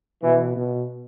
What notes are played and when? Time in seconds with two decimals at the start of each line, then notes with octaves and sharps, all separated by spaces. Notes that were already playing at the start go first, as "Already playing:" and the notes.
0.24 B2 E3
0.56 B2